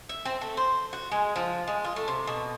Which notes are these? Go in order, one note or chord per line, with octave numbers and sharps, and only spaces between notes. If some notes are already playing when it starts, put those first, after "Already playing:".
E5
C4
A3
C5
F#4
G#3
F3
G#3
F4
A3
C3
B2